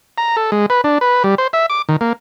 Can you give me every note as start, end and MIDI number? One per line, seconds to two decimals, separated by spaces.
0.18 0.36 82
0.37 0.51 69
0.52 0.66 56
0.70 0.81 71
0.84 0.98 62
1.01 1.23 71
1.24 1.35 55
1.38 1.47 72
1.53 1.66 76
1.70 1.82 86
1.89 1.96 51
2.01 2.13 58